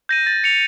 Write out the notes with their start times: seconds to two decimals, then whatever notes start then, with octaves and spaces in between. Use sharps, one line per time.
0.09 G6 A#6 D#7
0.26 A6
0.44 C#7 F7